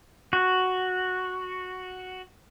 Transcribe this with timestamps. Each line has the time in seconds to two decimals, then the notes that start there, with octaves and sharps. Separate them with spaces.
0.33 F#4